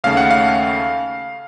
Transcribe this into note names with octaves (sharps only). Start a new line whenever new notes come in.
D#2 C#3 A3 C#4 F5
F#5
F5